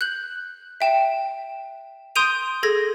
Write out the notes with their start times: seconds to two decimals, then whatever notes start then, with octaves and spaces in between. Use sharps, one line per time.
0.01 F#6 G6 F#7
0.81 E5 G5 E7
2.16 C6 D#6 G6 D7 D#7 F7
2.63 G#4 A4 G#6 A#6